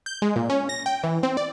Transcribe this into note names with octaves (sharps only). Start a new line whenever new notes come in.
G6
G#3
A#2
C#4
A#6
G5
E3
C4
D5